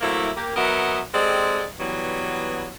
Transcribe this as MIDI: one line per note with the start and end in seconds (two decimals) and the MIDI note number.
0.01 0.31 54
0.01 0.31 57
0.01 0.31 58
0.01 0.31 60
0.01 0.31 64
0.36 0.52 58
0.36 0.52 67
0.56 1.01 54
0.56 1.01 59
0.56 1.01 70
0.56 1.01 75
0.56 1.01 76
0.56 1.01 78
1.14 1.65 56
1.14 1.65 60
1.14 1.65 67
1.14 1.65 69
1.14 1.65 74
1.14 1.65 75
1.80 2.71 52
1.80 2.71 54
1.80 2.71 55
1.80 2.71 59